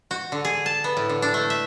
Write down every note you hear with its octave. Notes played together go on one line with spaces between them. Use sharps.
F#4
D3
G#4
A5
B3
A2
D3
D4
A3
E5